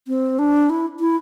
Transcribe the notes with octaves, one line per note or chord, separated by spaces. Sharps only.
C4
D4
E4
E4